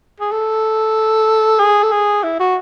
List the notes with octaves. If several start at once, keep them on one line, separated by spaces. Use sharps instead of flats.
G#4
A4
G#4
A4
G#4
E4
F#4